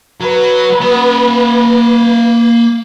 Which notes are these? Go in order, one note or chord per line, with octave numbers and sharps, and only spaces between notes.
F#3 B4
A#3 F#5